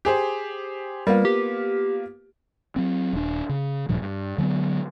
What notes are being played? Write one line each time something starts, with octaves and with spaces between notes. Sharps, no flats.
G4 G#4 C5
G3 A#3 B3 F4
G4
F#3 C4
D#1 D4
C#3
D1 G2 A#2 F3
G2
D3 F#3 G#3 B3